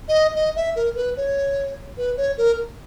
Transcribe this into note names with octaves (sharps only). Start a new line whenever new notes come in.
D#5
D#5
E5
A#4
B4
C#5
B4
C#5
A#4